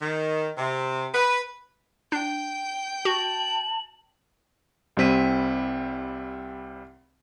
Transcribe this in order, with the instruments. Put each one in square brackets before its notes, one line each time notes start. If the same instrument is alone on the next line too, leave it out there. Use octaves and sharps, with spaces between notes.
[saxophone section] D#3
C3
B4
[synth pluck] D4 [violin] G5 G6
[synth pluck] F#4 [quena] A5 [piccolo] F#7
[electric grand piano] C2 G3 C4 B6 D#7